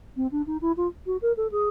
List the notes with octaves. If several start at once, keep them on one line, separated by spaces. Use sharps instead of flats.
C4
D4
D#4
E4
F4
F#4
A#4
A4
G#4